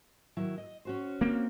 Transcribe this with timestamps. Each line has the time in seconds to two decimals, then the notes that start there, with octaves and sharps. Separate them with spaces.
0.37 D#3 F#3 E4
0.58 D#5
0.85 C#4 F#4 C5
1.21 A#3 C4